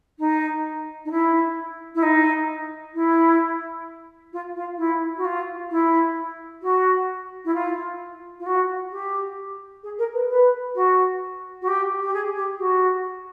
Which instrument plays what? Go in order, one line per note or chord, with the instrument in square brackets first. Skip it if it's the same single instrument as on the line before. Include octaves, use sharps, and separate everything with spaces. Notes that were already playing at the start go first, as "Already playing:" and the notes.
[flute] D#4
D#4
E4
E4
D#4
E4
F4
F4
E4
F#4
F4
E4
F#4
E4
F4
F4
F#4
G4
G#4
A#4
B4
B4
F#4
F#4
G4
G4
G#4
G4
F#4